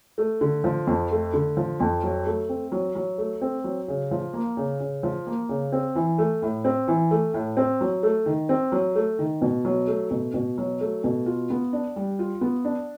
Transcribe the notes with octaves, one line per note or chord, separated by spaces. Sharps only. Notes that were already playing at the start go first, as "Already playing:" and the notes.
A3
D3
F3
F2
A3
D3
F3
F2
F#3
A3
C4
F#3
F#3
A3
C4
F#3
C#3
F3
A#3
C#3
C#3
F3
A#3
C#3
C4
E3
A3
A2
C4
E3
A3
A2
C4
F#3
A3
D#3
C4
F#3
A3
D#3
B2
F#3
A3
B2
B2
F#3
A3
B2
F4
B3
D4
G3
F4
B3
D4